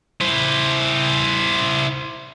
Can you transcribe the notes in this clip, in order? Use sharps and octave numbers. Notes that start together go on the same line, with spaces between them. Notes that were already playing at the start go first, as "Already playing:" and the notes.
E4 C5